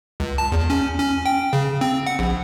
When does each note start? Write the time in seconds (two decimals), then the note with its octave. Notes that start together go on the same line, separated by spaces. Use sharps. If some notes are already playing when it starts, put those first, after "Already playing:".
0.20 C#2
0.38 A5
0.52 E2
0.70 C#4
1.00 C#4
1.26 G5
1.53 C#3
1.81 C4
2.07 F#5
2.19 A#1